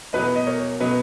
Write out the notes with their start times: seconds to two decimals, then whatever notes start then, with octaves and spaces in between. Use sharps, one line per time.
0.13 E2 B2 F#3 B4 D#5
0.36 D#5
0.47 A#4 C#5
0.80 B2 F#3 B4 D#5